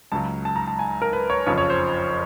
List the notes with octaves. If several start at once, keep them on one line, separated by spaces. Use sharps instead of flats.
C#2 C#3 F#3 A5
A5
A#5
A5
G#5
A#4
B4
C#5
F#1 F2 C#3 F3 C#5
C#5
C5